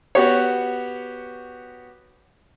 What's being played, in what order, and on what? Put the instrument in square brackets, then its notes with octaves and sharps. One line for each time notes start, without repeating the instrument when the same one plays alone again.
[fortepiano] B3 F#4 G4 C#5